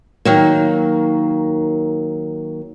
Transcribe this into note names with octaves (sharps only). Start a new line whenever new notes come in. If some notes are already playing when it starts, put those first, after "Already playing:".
D#3 F#3 A#3